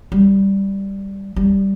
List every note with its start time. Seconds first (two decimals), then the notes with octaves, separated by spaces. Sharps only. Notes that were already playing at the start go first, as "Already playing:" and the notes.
0.12 G3
1.36 G3